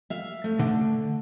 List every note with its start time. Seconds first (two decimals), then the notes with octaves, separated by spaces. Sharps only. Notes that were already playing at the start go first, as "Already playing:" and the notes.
0.10 E5 F5
0.44 A3
0.59 D3